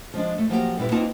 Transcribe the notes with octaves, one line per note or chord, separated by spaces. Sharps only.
F3 G#3 D4
A3
F3 F#3 A#3 G4
G2 A#2 G3 E4 B4
A#3 C4 D#4 F4 B4 A5